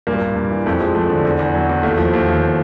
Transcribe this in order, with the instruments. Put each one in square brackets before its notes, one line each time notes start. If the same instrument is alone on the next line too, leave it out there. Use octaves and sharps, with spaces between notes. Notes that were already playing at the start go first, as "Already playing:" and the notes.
[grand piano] G2 A#2 A#3
G2
G2
E3
F2 A3
F3 G#3
F3 A3
D3
E2
E2
F#3
E2
D#2 A3
F3
D#2
D#2